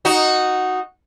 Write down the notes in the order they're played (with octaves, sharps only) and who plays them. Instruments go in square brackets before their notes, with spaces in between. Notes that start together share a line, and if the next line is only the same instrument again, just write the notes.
[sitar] D#4 F#4